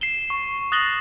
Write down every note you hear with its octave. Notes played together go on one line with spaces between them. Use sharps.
C7 E7 G7
C#6
D#6 F#6 A6 A#6 F#7 G7